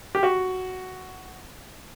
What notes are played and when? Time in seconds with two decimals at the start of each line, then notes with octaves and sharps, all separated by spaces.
0.15 G4
0.23 F#4